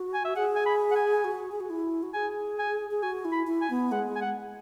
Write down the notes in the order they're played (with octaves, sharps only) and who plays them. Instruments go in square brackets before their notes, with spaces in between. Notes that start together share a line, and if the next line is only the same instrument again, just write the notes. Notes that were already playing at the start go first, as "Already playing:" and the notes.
Already playing: [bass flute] F#4
[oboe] G#5
E5
[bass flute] G#4 [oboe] F#5
[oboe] G#5
B5
F#5
G#5
[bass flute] F#4
G#4
F#4
E4
F#4
[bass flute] G#4 [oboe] G#5
[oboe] G#5
[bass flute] G#4
[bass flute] F#4 [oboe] G#5
[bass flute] E4
[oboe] B5
[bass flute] E4
[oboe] G#5
[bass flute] B3
[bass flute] G#3 [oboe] F#5
[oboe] G#5
F#5